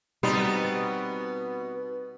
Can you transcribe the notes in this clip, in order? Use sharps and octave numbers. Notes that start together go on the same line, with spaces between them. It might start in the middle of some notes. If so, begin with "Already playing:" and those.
B2 G3 B3 C4 D#4